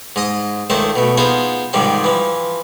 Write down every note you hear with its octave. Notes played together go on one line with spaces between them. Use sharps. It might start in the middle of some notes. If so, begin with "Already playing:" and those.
G#2 D#5 D#6
C#2 D#3 A3 C5 A5
B2 A3
B3 D#4 F4 G#4 C5
G#2 C3 D#3 F3 G3
E3 F3